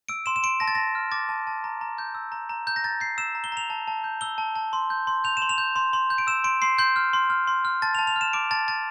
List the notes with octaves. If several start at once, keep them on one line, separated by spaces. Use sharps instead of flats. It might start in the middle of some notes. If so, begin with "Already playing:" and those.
E6 D7
C6 E7
E7
C6 D7
A5 A#6
A6
A5 A#6
F6
D6 A6
A5
A5
A#5
A#5
G6
E6
A#5
A#5
A#5 G6
A#6
A#5 A6
G6 C7
E6 E7
A#5
G7
A#5 F7
A5
A5
G6
E6 G7
A5
A5
C6
G6
C6
G6 F7
C6 E7
F7
G6
C6
C6
G6
D7
E6 E7
C6 D7
C6 C7
C6 G6
F6
C6
F6
C6
F6
A5 A6
F7
A5
F7
F6
E7
D6 D7
A5 A6
A5 A6